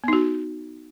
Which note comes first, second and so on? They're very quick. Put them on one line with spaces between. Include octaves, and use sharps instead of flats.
B3 D#4 F#4